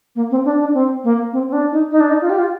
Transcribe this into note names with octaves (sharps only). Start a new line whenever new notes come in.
A#3
C4
D4
D4
C4
A#3
C4
C4
D4
D#4
D#4
D4
D#4
F4
G4
F4